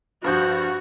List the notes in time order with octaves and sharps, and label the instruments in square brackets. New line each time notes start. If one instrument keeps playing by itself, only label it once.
[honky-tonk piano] G2 F3 G6 [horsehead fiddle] F#4